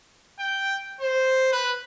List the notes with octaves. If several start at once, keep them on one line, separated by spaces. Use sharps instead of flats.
G5
C5
B4